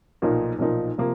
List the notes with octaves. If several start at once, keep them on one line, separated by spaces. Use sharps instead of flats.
B1 A#2 F3 A#3 D#4
B1 A#2 F3 A#3 D#4
C3 F3 A#3